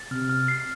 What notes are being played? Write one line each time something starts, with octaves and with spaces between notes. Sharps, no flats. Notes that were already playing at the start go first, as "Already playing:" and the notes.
Already playing: A6
C3 F6
F6
C7